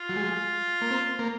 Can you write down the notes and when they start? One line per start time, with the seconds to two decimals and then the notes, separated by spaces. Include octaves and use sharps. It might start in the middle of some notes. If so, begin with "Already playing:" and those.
Already playing: F4
0.09 F#3
0.16 G#3
0.81 A#3
0.90 C4
1.19 A#3